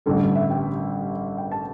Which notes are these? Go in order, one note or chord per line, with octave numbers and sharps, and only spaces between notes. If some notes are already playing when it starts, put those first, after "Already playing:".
A1 G2 D3 G3 A4
E5
G5
G5
A5